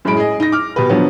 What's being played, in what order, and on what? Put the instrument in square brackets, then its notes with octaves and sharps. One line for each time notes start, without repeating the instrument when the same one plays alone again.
[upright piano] F#2 A2 G#3 B5 D7
G#4 D#5
D#4 A#6
D6 F6
B2 G4 B4
B2 D3 F3 F#3 B3